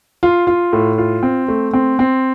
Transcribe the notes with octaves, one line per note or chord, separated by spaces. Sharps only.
F4
F4
A2
F4
C4
A3
C4
C4